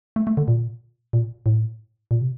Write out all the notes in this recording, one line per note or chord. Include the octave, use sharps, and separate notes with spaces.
A3
A3
D3
A#2
A#2
A2
A#2
C3